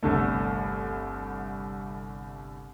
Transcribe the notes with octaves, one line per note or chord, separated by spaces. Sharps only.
G1 C2 D3 A3